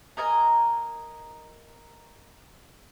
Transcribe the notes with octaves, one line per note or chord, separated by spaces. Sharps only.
A#4 D#5 G#5 A#5